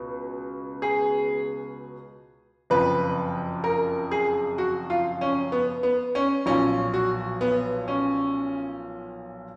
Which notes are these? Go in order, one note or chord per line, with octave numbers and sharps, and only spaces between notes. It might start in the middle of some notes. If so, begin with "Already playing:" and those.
Already playing: C#2 B2
G#4
F#1 F2 F3 B4
A#4
G#4
F#4
F4
C#4
B3
B3
C#4
B1 A#2 F3 C#4
F#4
B3
C#4